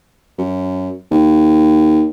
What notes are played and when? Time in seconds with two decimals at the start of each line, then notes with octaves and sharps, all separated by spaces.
0.38 F#2
1.11 D#2